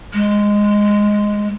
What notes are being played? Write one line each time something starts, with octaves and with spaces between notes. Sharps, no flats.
G#3